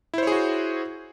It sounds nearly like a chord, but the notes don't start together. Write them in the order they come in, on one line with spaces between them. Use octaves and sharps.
E4 C5 C#5 G#4 F#4